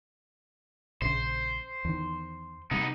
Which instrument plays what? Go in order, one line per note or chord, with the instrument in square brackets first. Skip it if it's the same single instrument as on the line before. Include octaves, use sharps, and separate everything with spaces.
[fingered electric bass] A#1 C#3 [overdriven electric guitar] C5
[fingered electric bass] E2 D#3
[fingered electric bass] C3 G3 [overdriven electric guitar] B3 D#4